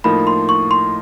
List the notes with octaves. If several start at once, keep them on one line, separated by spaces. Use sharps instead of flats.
A2 F3 A#3 D#4 B5
C6
C#6
C6